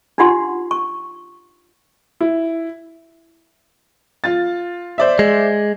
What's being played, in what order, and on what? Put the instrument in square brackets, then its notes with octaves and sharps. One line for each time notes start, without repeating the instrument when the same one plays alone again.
[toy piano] D4 D#4 F4 G4 F#5 C6
C#6
[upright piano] E4
F4 A6
C5 D5 E5
[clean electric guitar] G#3